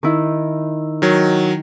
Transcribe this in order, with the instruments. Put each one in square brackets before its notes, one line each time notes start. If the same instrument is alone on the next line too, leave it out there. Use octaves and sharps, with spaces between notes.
[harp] D#3 E4
[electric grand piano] D#3 F#3